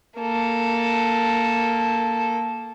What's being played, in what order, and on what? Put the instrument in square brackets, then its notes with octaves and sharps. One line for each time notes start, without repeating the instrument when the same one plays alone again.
[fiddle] A#3 A4